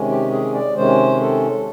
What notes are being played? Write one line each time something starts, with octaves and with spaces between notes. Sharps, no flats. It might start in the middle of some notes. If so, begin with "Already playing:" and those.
Already playing: C3 D#3 G#3 C#4
G4
G#4
D5
C3 D#3 G#3 C#4 C5
A4